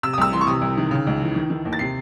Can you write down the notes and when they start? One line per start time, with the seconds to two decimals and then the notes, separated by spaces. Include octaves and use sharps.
0.03 C3 E6
0.13 D#6
0.18 C2 E6
0.32 E3 C6
0.41 C#6
0.47 C3 D#6
0.62 C2
0.77 D#3
0.91 C#3
1.07 C#2
1.22 E3
1.35 D#3
1.50 D#3
1.65 D#2
1.73 A6
1.79 C3 C7